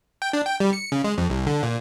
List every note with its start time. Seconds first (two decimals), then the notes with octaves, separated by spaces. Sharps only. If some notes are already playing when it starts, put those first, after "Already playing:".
0.22 G5
0.33 D4
0.46 G5
0.60 G3
0.73 C#7
0.92 C#3
1.04 G#3
1.18 F2
1.30 C2
1.47 D3
1.63 A#2